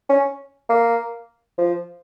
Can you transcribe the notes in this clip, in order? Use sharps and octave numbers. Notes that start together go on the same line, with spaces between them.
C#4
A#3
F3